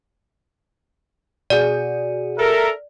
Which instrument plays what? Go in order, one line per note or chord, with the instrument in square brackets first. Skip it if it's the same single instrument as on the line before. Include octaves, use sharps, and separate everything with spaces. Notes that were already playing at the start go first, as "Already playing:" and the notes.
[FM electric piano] B2 F#4 G#4 [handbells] D5
[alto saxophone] A4 [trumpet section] A#4 E5